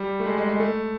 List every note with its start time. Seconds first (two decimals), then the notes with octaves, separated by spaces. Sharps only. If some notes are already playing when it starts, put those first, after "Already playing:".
Already playing: G3
0.20 A3
0.26 G#3
0.38 G#3
0.49 G#3
0.60 A3